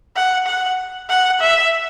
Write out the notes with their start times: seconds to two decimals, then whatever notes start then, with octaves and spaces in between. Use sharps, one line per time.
0.16 F#5
0.47 F#5
1.09 F#5
1.40 E5